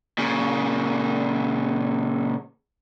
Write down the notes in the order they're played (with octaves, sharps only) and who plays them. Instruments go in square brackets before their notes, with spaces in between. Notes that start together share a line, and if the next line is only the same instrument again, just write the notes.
[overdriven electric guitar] A#2 C#3